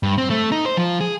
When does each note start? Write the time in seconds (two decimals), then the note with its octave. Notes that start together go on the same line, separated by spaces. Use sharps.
0.03 G2
0.18 C4
0.30 A3
0.52 D#4
0.65 C5
0.77 F3
1.01 G#4